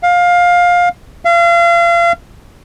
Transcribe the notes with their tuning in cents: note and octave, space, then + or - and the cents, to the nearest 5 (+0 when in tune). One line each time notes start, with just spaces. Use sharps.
F5 +20
F5 -35